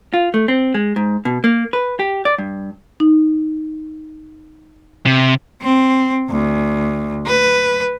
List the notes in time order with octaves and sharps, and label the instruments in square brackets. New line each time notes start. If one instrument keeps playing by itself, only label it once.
[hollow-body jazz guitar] F4
A3
C4
G#3
G#2
B2
A#3
B4
G4
D5
G2
[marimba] D#4
[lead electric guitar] C3
[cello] C4
D2
B4